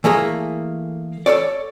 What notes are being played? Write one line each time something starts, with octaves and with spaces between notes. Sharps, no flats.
E3 A3 A#3 G#4
A4 B4 C#5 D5